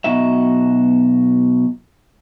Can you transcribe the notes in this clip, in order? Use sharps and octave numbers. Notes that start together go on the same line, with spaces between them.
B1 B2 D#4 F#4 E5